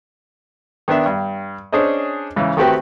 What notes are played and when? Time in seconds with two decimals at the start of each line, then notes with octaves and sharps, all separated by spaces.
0.88 D#3 B3 D4 E5
1.06 G2
1.72 C#4 D4 G#4 C5 D#5
2.36 G#2 C#3 E3
2.57 D#3 A3 C4 F#4 G4 B4